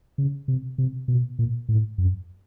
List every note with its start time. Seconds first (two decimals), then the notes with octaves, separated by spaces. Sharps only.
0.18 C#3
0.48 C3
0.78 C3
1.08 B2
1.39 A#2
1.69 A2
1.98 F#2